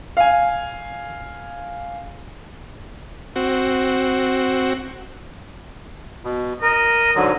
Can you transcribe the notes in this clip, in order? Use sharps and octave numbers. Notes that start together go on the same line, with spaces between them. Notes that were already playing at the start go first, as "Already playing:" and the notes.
F5 G#5
C4 F#4
B2
A#4 D#5
G#2 D3 F#3